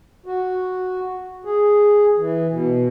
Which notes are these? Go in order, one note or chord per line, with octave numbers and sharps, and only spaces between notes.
F#4
G#4
E3
B2